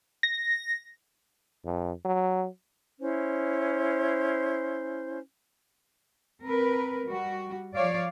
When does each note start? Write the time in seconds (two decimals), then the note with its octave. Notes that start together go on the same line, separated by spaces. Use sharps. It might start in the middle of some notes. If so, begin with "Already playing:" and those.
0.23 A#6
1.65 F2
2.05 F#3
3.00 C#4 E4 C5
6.42 C4 A#4 B4
7.07 G3 F#4
7.74 F3 C#5 D5 F5